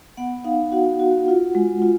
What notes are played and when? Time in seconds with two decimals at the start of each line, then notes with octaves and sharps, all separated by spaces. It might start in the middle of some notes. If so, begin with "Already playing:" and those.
0.17 B3 F#5
0.44 D#4 F5
0.72 F#4 F#5
1.00 F#4
1.28 F4
1.55 G#3
1.82 F4